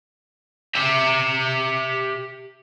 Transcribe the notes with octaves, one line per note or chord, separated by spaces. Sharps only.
G4 E5